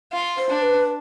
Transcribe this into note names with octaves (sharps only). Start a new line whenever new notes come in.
F4
C5
D4
B4